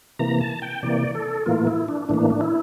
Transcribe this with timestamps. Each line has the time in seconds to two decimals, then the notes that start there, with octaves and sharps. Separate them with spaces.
0.19 C3 E3 A#3 A#5
0.40 A5
0.62 G5
0.83 C3 E3 A#3 D5
1.15 A4
1.46 A2 E3 A#3 F4
1.67 E4
1.88 D4
2.09 A2 E3 A#3 D4
2.30 D4
2.41 E4